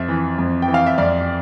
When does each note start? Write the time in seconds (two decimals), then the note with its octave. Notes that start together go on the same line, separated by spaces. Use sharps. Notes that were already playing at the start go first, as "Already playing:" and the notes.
Already playing: F2 E5
0.09 E3
0.38 F2
0.62 G5
0.68 E3
0.74 F5
0.86 E5
0.98 F2 D5